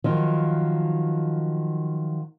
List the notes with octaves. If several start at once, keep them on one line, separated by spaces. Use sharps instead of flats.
D#3 F3 F#3